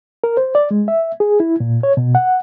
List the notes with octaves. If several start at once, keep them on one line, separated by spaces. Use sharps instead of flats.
A#4
C5
D5
G#3
E5
G#4
E4
A#2
C#5
B2
F#5